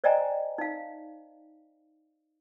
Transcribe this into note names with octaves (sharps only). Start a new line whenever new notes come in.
C5 D5 D#5 G5 G#5 A#5
D#4 F5